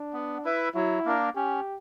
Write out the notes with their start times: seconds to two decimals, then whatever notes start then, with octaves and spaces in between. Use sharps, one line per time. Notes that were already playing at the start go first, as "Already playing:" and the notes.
Already playing: D4
0.13 B3
0.45 E4 B4 E5
0.74 F#3 E4
1.05 A#3 D4 A#4
1.36 C#4 G4